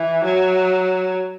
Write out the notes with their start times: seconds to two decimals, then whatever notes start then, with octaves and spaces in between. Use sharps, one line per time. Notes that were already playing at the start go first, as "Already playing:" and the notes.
Already playing: E3
0.25 F#3